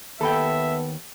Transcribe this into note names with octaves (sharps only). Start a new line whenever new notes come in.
D#2 B3 A4 E5 G5 B5